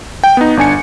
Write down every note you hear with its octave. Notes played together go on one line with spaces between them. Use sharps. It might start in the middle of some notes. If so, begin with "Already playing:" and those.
G5
B3 D#4
G1 D4 G#5 C#7